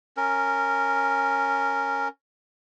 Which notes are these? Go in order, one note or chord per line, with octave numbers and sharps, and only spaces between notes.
C#4 A#4